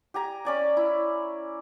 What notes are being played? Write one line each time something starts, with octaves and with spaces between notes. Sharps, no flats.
G4 G#5 A#5
C#4 D5 G#5
E4